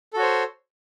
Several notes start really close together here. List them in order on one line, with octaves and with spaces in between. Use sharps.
A4 F#4 C#5 C5